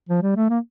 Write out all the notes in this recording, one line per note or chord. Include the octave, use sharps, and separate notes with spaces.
F3
G3
A3
A#3